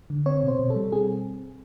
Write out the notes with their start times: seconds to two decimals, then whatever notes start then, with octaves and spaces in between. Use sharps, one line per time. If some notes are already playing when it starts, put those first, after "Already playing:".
0.10 D3
0.26 C4 C#5
0.43 B2
0.48 C5
0.59 B2
0.70 A4
0.76 G3
0.92 C4 G#4